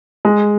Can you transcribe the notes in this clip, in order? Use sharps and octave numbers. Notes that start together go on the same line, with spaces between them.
G#3